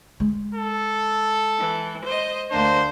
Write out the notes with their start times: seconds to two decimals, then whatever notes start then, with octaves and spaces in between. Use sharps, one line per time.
0.20 G#3
0.55 A4
1.58 E3
2.04 C5 D#5
2.51 D2 A#3 D4 C5